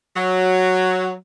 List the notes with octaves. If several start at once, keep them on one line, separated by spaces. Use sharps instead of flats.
F#3